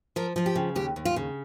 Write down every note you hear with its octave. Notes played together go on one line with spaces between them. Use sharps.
F3 A#4
F3 F4
G4
C#3
D#2 G4
D#2
F4
C#3